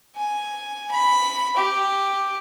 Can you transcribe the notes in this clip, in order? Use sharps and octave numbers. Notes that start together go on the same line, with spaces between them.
G#5
B5
G4